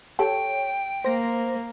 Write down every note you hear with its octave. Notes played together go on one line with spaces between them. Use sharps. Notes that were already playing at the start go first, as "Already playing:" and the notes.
G4 A4 C#5 G5
A#3 C5 A#6